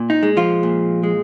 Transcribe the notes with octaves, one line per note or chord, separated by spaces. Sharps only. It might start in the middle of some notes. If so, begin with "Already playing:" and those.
Already playing: A#2
D#4
G#3
F3 F4
A#2
G#3